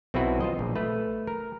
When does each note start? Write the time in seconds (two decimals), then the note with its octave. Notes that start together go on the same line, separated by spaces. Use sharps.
0.14 B1 C4 E4 F#4 B4
0.41 F4 C5 D#5
0.59 A#1
0.75 A3 B4
1.27 A#4